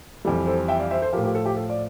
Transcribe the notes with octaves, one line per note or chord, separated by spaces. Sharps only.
F2 E3 G3 A4
A4 C5
E5 G5
D5 F5
C5 E5
A4 C5
A2 F3 G4 A#4
G4 A#4
A4
G4
A4
D5